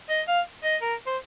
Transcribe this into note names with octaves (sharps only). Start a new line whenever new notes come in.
D#5
F5
D#5
A#4
C5